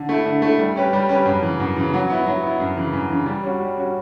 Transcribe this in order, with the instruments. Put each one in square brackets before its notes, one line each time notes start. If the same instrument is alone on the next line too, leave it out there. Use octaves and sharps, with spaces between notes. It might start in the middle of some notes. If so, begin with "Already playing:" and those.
Already playing: [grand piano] D3
A3 E4
D3
A3 E4
G3
C#4 G4 B4
G3
C#4 G4 B4
F#2
C#3 E3
F#2
C#3 E3
F#3
B3 E4
F#3
B3 E4
F#2
C#3 E3
F#2
C#3 E3
G3
C#4 F#4
G3
C#4 F#4